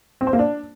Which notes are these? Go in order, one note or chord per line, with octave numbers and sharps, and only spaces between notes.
C4
C5
A#3
D4